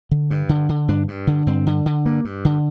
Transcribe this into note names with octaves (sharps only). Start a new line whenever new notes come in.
D3
G2
D3
D3
G2 D4
G2
D3
G2 C4
D3
D3
G2 A#3
G2
D3